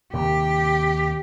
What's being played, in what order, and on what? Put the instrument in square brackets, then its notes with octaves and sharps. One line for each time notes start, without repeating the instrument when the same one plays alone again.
[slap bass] D#2 C3 D#3 [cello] G4